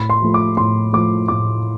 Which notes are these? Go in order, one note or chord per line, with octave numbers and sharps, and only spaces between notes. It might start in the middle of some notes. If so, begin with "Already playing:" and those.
Already playing: A2 B5
C6
F3 A3
D6
A2 C6
F3 A3 D6
A2 D6